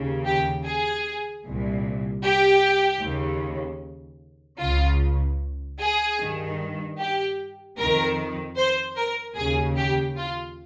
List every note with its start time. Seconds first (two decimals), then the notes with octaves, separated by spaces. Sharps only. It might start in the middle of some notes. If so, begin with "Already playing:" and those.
Already playing: D#2 C#3
0.25 G4
0.65 G#4
1.44 C2 A#2
2.23 G4
3.03 D#2 C#3
4.61 C#2 C#3 F4
5.80 G#4
6.20 G2 D#3
6.99 G4
7.79 F2 D#3 A#4
8.58 C5
8.98 A#4
9.37 D#2 C#3 G#4
9.77 G4
10.17 F4